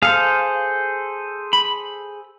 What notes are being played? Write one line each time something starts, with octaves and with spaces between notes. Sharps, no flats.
G#4 A4 C5 F5
B5